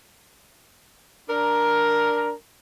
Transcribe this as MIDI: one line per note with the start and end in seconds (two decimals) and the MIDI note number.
1.29 2.33 62
1.29 2.33 70